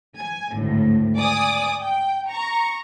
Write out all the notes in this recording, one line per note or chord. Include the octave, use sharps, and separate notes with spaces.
G#5
G#1 D2 A2
D5 G#5 D6 D#6
G5
A#5 C#6